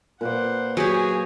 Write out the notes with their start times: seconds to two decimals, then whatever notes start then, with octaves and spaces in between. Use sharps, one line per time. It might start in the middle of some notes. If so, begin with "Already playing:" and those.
0.21 A#2 B4 C5 F#5 D6
0.77 F#3 G4 G#4 C#5 G#5